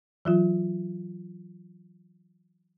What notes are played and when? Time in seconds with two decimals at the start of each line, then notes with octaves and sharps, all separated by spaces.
0.25 E3 F#3 F4